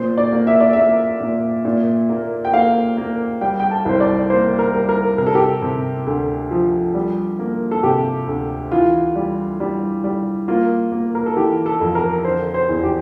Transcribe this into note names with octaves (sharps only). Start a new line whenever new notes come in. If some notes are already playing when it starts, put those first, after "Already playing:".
Already playing: A#2 C5
D5
A#3
E5
D5
A#3 E5
A#2
A#2
A#3
G5
A#3 F5
A#3
G3 G5
G5
A5
C2 C5
D5
A#3 C5
A#4
G3
A#4
C3 A#4
A4
G4
A4
C3
D2
F3
G3
A#3
A4
C3 G4
D2
E3 F4
G3
G3
G3
A#3 F4
A#3
A#4
A4
E3 G4
A4
F2
A#4
D3 C5
C5
E2
G4